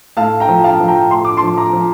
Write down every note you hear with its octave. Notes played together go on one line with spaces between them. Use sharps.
A2 F5 A5
G5 A#5
F3
F5 A5
F3
G5 A#5
A2 C6
D6
A5 C6
F3
A#5 D6
F3